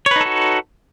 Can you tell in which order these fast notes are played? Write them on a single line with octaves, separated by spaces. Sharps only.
C#5 B4 D#4 A4 F#4